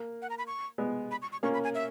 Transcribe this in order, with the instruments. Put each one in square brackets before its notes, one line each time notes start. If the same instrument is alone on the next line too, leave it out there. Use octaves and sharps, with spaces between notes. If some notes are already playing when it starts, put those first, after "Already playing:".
Already playing: [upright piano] A#3
[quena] F#5
A#5
B5
C#6
[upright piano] G#3 B3
[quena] B5
C#6
C#6
[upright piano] A#3 C#4 [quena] C#6
[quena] B5
G#5
E5